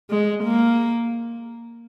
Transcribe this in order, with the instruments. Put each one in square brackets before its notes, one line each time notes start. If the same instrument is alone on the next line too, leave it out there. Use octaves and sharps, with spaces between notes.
[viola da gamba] G#3
A#3